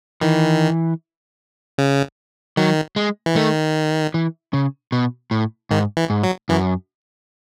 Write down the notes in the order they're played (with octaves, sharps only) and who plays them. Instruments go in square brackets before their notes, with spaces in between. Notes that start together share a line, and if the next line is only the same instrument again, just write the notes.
[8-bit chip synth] D#3 [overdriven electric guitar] E3
[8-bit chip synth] C#3
[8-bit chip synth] D#3 [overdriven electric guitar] F#3
[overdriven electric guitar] G#3
[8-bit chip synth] E3
[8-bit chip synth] D#3 [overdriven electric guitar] A3
[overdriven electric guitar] E3
C#3
B2
A2
[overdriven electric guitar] G#2 [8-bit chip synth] D#3
[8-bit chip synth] E3
[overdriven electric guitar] G#2
[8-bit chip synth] F#3
[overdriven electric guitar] F#2 [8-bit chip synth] E3